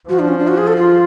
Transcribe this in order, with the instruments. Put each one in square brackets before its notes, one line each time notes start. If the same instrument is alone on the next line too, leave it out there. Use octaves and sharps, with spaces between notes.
[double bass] F3 [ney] F#4
[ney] D4
C#4
D4
F#4
G#4
A4
F4